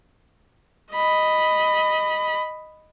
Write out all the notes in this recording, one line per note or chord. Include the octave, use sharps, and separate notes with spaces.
D#5 B5